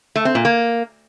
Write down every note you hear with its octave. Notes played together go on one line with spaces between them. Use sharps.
A3
C4
A#2
A#3